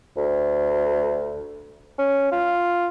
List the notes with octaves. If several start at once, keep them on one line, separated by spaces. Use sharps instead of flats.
D2
C#4
F4